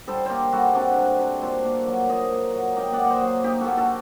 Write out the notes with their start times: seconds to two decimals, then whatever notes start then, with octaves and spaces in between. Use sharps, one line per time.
0.07 G3 A4 C5
0.26 A#3 G4 A#4 C5
0.52 G3 F#4 A4
0.74 C3 D4 F#4
0.98 C3
1.19 C3
1.42 A#2 A4 C5
1.65 A#3
1.87 F#3
2.09 A#2 C5 D#5
2.32 A#3
2.54 F#3
2.76 A#3 D#5 G5
2.93 D5 F#5
2.99 A#3
3.05 C5 D#5 F#5
3.21 F#3
3.44 A#3 D#4 G4
3.61 F#4 A4
3.66 A#3
3.77 F#4 A4